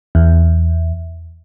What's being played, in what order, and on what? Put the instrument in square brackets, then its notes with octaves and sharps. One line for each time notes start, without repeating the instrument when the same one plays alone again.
[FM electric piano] E2